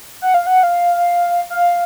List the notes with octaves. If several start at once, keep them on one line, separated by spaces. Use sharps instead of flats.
F#5
F5
F#5
F5
F5